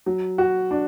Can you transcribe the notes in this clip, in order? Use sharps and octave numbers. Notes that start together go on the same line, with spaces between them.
F#3
F#4
D4